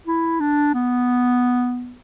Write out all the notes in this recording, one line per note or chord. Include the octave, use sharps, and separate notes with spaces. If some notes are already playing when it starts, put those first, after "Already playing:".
E4
D4
B3